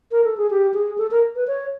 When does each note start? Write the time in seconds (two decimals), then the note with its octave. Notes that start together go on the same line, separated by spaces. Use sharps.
0.12 A#4
0.24 A4
0.37 G#4
0.50 G4
0.74 G#4
0.98 A4
1.11 A#4
1.36 B4
1.47 C#5